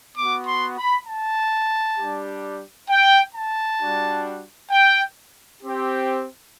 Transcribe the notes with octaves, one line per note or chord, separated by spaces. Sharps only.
B3 D6
F#4
C6
B5
A5
G3 D4 G4
G5
A5
G3 D4 F#4
G5
C4 G4